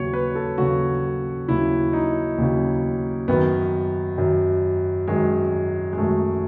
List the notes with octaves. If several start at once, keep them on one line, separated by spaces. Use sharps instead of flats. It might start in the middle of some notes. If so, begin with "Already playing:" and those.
Already playing: D#2 C#3 F#3 C#5
B4
A4
D#2 C#3 F#3 F#4
D#2 C#3 F#3 E4
D#4
D#2 C#3 F#3
F#2 D#3 F#3 B3
F#2 D#3 F#3
F#2 D#3 F#3 G#3
G#3
F#2 D#3 F#3 A3